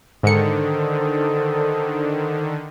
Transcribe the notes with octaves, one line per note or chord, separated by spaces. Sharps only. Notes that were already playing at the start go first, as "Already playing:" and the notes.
G#2 D3 D#3 A4 C5 D#6 C#7